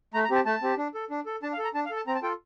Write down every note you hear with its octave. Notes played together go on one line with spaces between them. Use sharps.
A3 A#5
A#5
C4 G4 A5
A3 A5
C4 G4
D4
A4
D4
A4
D4 A5
F5
A4
A#5
D4 A5
F5
A4
A5
C4 A#5
A5
F4 A4 G5